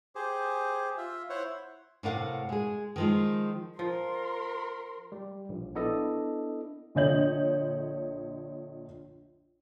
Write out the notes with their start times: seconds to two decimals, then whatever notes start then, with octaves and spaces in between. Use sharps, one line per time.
0.15 G4 G#4 C5
0.97 F4 E5
1.30 E4 C5 C#5 F#5
2.03 A2 C3 A#4 F5 F#5
2.49 G#3 G#4
2.96 D#3 F3 G#3
3.79 F3 A#4 C6
5.12 G3
5.49 A#1
5.75 B3 D4 E4 A4 D#5
6.95 A#1 D3 C#5 D#5 G6 F#7